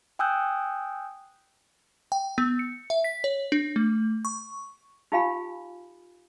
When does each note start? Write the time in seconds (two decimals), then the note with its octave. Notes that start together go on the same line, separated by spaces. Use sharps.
0.19 G5 G#5 D#6 E6 F#6 G6
2.12 G5
2.38 B3
2.59 C#7
2.90 E5
3.04 B6
3.24 C#5
3.52 D4
3.76 A3
4.25 C#6
5.12 D#4 F4 G4 F5 G#5 B5